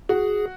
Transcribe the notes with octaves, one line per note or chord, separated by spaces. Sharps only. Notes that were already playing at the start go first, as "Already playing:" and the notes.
F#4 G#4